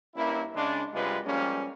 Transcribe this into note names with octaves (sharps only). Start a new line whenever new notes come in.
G2 A#3 C#4 E4
C#3 G#3 D4
F#2 C3 G3 G#3 F4 B4
F3 G3 G#3 A#3 C#4